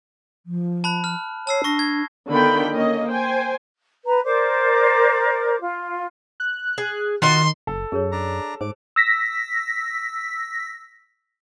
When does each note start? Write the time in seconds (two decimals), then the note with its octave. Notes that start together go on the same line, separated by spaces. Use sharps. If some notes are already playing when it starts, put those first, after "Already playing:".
0.46 F3
0.84 A5 B5 F#6
1.04 F6
1.47 C#5 A5 E6 C7
1.64 D4 C#6 A#6
1.79 G#6
2.30 D3 D#3 B3 F4 G5 B5
2.71 A#3 C#4 D#5
3.09 C5 G5 G#5
4.06 B4 A#5
4.24 A#4 C5 D5 D6
5.59 F4
6.40 F#6
6.78 G#4
7.22 D#3 F4 F#4 D#5 C6
7.67 F#1 A4
7.92 F#2 G#4 A#4 C#5
8.12 D4 A#5
8.61 G#2 C5 D6
8.96 E6 A#6 B6